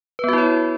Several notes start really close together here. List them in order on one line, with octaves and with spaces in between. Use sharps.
B4 B3 F#4 E4 C#5